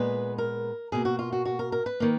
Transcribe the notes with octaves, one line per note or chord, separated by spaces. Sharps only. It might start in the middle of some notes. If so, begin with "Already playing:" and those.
Already playing: A#2 G#3 B3 B4
A#4
B2 A#3 G#4
F#4
F4
F#4
F#4
A#4
A#4
B4
D#3 A#3